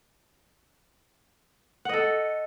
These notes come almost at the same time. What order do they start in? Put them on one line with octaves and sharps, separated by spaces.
F#5 D#5 A4